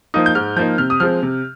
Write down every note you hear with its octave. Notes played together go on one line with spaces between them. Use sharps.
F3 A#3 D#4 D#6
G6
G#2 F6
F3 A#3 D#4 G6
C3 F6
D#6
F3 G#3 C4 F6
C3